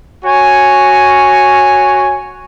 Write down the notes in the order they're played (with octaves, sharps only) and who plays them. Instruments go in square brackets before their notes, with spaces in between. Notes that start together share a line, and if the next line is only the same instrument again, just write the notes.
[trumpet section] F#4 C#5 G#5